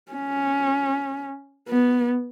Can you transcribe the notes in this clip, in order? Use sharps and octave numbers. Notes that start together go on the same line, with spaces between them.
C#4
B3